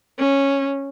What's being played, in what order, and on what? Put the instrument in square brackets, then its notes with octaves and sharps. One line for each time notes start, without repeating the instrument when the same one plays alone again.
[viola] C#4